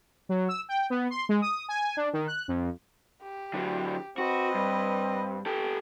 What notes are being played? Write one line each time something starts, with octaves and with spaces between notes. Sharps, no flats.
F#3
E6
G5
B3
C6
G#3
D#6
G#5
D4
D#3
F#6
F2
G4
D3 F#3
C4 F#4 B4 D#5
G2
G4 A4